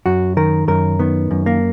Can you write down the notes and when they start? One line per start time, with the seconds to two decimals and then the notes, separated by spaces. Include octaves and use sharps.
0.06 F#2 F#4
0.37 D#3 A#4
0.68 F#2 A#4
0.99 D#3 B3
1.31 F#2
1.46 A#3